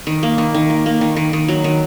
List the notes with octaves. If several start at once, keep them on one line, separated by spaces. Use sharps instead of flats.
D#3
A#3
D#3
D#3
A#3
A#3
D#3
D#3
D#3
F#3
D#3